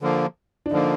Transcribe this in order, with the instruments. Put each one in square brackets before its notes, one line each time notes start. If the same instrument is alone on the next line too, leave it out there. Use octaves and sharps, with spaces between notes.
[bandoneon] D3 F3 A#3
[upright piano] D4
[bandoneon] D3 F3 A#3 [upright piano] D#4